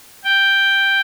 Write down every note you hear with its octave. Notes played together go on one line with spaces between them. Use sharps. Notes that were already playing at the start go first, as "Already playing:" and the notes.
G5